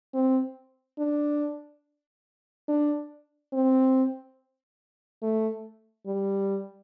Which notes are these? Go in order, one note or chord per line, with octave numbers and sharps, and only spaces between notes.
C4
D4
D4
C4
A3
G3